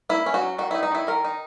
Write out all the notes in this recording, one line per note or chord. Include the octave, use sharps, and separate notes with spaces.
A#3 E4
C#4
F#4
F#3
D#3 F#4
D#4 E4
D#4
D#3 E4
D#3 A#4
D#4